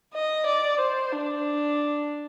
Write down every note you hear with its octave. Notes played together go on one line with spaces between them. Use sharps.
D#5
D5
C5
D4